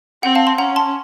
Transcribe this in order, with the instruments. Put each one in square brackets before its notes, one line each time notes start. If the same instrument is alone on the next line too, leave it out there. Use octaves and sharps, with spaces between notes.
[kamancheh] C4 [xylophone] F#5
[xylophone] F5 A5
A5 C6
[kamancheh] C#4 [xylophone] F#5 A#5
[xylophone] A5 C6